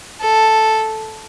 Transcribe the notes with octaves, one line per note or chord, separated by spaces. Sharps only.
A4